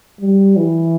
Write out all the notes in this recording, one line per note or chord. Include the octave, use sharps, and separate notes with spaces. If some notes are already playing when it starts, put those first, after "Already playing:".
G3
E3